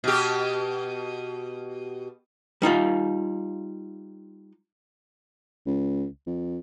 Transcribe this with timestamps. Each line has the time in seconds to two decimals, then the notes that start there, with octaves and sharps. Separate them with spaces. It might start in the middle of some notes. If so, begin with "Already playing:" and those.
0.04 B2 G4
2.62 G3 D#4 F4 F5
5.67 C#2
6.27 F2